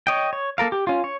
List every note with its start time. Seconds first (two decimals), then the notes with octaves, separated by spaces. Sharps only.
0.07 C#5 D#5 G5
0.33 C#5
0.58 A#3 A4 A#4 F5
0.72 G4
0.87 C#4 F4
1.04 C#5